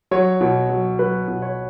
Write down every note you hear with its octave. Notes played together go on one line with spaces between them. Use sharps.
F#3 C#5
B2
F#3
F#3 B4
B2
C#5